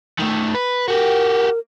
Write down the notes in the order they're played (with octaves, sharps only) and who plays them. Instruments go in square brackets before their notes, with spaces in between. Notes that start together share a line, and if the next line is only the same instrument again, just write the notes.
[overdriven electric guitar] D#3 A3
B4
[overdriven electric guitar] F#4 G4 [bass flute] A#4